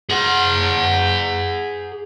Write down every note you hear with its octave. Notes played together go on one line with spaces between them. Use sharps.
G#4 F#5